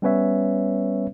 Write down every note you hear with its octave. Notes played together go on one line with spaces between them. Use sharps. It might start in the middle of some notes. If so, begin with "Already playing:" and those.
G3 B3 C#4 B4 C#5 E5